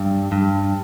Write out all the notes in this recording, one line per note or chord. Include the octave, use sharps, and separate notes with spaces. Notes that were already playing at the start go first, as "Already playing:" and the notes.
Already playing: G2
G2